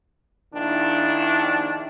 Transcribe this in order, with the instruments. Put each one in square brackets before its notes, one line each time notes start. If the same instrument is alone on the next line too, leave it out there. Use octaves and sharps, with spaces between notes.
[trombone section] A#1 D#3 D4 E4